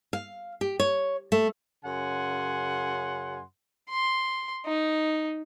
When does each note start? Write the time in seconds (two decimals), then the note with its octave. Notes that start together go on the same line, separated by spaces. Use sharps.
0.13 F5
0.61 G4
0.80 C#5
1.32 A3
1.85 F#2 C#3 F#5 G#5 C6
3.90 C6
4.65 D#4